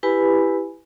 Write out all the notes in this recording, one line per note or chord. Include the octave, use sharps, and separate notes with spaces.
E4 G4 B4 G#5 B5